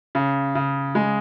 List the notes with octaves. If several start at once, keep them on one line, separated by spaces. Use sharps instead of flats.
C#3
C#3
G#3